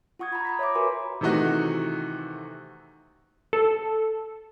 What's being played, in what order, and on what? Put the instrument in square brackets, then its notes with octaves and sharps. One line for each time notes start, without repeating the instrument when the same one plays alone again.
[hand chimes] F4 F#5 C#6 D#6 G#6
A#5 B5
A#5 B5 B6
C#5 E5 A#5 B5 D6
F#4 A#4 B4 G#5 C6
[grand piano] C3 D#3 E3 A3 D#4 F#4
[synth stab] A4